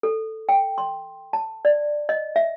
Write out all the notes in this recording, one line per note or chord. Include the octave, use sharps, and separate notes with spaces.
A4
G5
C6
A5
D5
D#5
E5